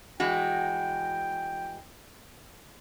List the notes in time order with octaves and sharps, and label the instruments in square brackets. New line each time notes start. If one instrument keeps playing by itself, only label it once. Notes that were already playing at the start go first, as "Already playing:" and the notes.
[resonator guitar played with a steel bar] E3 G#3 F#4 [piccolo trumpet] G5